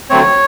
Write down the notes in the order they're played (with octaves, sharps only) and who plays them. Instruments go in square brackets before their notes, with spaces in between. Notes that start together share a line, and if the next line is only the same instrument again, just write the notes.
[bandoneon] D3 F#3 A3 C4 C#5